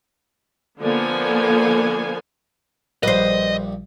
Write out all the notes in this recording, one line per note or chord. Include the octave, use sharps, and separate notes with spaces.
D3 F3 A#3 B3 A4 G#5
A#1 G2 B4 C5 D#5